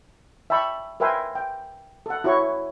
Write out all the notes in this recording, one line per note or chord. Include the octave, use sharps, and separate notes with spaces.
E5 G5 A5 B5 C#6
A#4 B4 E5 G5 G#5 C6
G5
A4 F#5
E4 F#4 C#5 C#6